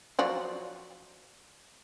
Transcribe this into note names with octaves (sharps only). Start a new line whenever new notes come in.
F3 F#3 D5